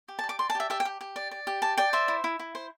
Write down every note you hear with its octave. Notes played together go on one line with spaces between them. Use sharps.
G4
A5
D5
D6
D5 C6
A5
G4 E5
G4 E5
G5
G4
G4
D5
D5
G4
D5 A5
D5 G5
C5 E5
E4
E4
E4
C5